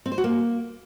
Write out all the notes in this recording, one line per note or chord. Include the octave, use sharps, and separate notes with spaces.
C4
C5
F#4
A#3